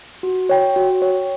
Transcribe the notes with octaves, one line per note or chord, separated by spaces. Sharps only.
F#4
C#5 G5
F#4
C#5 G5